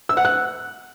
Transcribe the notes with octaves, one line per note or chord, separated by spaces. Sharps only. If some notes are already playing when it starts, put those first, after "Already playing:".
E6
F#5
F#6